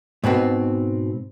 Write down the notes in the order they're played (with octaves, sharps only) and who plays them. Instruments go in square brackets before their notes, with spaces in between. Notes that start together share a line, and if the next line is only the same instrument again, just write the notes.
[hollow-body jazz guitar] G#2 B2 B3 C4